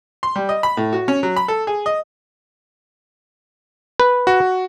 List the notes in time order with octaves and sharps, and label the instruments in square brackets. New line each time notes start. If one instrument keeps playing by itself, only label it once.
[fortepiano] C6
G3
D#5
B5
A2
F#4
C#4
F#3
B5
A4
G#4
D#5
[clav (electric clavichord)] B4
[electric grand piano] F#4